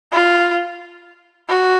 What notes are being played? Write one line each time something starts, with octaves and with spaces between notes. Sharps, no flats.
F4
F#4